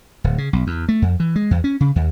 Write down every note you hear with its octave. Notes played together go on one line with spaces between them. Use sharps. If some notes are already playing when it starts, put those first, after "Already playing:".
D1
C#3
B1
E2
A3
F2
E3
G#3
E2
C#4
C#3
D#2